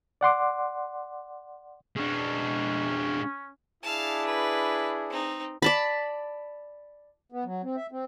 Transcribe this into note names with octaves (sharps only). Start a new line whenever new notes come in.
D5 F#5 C6 D6
G#3 C#4 D4
D4 E4 G#4 F5 A5
B4
C4 D#4
D5 A5 B5
B3
F#3
C4
E5
C4